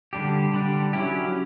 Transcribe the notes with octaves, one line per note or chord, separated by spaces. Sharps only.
D3 G3 D4 G4
D3 G3 D4 G4
F#3 C#4 E4 G4